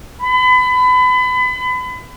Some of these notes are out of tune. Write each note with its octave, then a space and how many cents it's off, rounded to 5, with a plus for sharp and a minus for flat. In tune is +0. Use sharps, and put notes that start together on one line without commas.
B5 +30